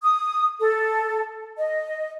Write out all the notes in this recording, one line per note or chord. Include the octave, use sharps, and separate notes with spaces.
D#6
A4
D#5